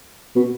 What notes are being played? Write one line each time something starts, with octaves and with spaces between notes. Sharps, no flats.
B2